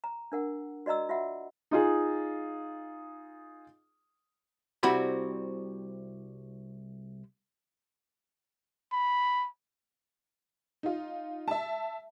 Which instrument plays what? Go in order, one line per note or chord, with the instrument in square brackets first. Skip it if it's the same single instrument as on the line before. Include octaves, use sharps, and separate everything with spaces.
[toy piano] A#5
D4 A#4 F#5
F#4 D5 D#5 A#5 E6
F4 F#4 E5 F#5
[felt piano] D#4 F4 G#4
[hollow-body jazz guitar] C2 G3 C4 E4 F#4 B5
[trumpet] B5
[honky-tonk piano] D#4 F4
E5 A5